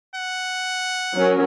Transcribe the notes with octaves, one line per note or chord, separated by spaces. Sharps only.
F#5
F#3 C#4 A#4